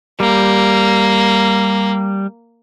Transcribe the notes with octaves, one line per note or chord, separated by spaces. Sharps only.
G3 A#3